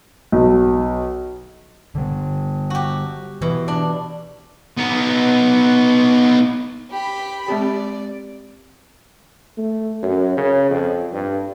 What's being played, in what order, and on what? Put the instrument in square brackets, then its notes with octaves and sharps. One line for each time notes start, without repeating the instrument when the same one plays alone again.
[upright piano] B1
[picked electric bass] D3 G3
[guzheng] F#4 G4
[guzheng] B2 [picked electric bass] E3
[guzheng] D4
[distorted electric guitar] B3 D#4
[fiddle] G4 B5
[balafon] G#3 C4 G4 [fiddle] D5
[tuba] A3
F#2
C#3
F2
G2